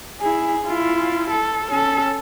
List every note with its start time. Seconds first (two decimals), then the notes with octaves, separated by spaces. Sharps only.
0.21 E4 G#4
0.65 E4 F4
1.30 A4
1.70 C#4 A4